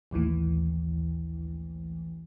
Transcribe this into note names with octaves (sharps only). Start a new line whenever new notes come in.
A#1 D#2 A2 E3